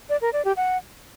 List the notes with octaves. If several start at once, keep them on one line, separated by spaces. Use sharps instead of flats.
D5
A#4
D5
G4
F#5